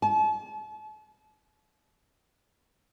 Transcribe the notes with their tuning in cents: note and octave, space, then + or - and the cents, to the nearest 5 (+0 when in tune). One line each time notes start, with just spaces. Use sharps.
A5 -40